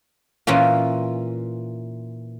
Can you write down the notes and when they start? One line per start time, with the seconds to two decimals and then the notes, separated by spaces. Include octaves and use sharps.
0.47 A#2 E3 C#4 F4